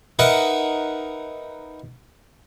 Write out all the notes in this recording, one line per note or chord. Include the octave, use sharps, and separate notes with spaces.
D#4 A#4 B4 E5 F#5